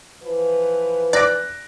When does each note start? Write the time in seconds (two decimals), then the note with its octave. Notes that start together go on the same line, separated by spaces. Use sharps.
0.24 E3 F3 B4
1.13 D5 F#6 A#6 D7